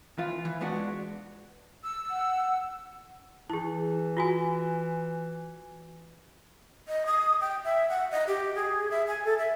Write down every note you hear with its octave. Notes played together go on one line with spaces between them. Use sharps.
E3 F4
E3
G#3 B3 D4 F#4
E6
F#5
E3 E4 G#4
F4 F#4 G#5
D#5
D#6
G5
E5
F#5
D#5
G4
G#4
E5
G#5
A4
E5